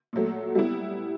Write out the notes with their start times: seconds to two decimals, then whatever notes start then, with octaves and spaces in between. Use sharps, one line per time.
0.13 A#2 F#3 A3
0.55 G3 B3 E4